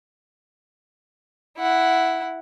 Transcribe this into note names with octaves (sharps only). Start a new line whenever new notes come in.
E4 F#5